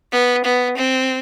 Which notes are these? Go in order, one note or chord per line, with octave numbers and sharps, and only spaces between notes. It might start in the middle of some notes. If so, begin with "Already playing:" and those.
B3
B3
C4